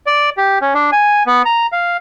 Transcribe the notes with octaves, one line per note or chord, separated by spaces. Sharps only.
D5
G4
C#4
D4
G#5
B3
A#5
F5